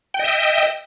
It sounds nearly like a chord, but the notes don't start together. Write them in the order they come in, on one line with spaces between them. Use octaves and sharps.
G5 D#5 E5